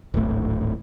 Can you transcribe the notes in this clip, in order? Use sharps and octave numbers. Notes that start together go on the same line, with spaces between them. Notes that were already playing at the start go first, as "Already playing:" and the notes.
D1 G#1 A3